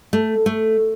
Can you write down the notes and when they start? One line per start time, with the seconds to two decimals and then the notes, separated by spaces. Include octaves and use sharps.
0.13 A3
0.46 A3